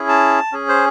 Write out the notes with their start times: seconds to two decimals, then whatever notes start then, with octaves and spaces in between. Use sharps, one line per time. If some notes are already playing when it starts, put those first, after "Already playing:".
Already playing: C#4 E4 G#4
0.09 A5
0.52 C#4 G#4
0.69 C5